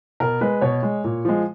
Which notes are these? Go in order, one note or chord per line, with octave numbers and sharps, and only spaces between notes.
B2 A#4
G#3 B4
B2 C#5
G#3
A#2
F3 G#3